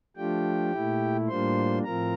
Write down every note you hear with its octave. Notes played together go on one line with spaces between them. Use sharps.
F3 A3 D4 F4 G4 G5
A#2 A3 E4
A2 G3 A#3 D4 F4 C5 C6
A2 F3 C4 F4 A#4 A#5